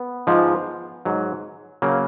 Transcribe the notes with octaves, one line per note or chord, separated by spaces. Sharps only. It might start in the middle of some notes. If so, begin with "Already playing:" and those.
Already playing: B3
G#2 F3 G#3
G#2 F#3
C#3 F#3 A#3